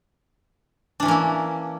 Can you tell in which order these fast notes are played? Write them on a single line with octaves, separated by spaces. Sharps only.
D4 E3 C#4 A#3 E4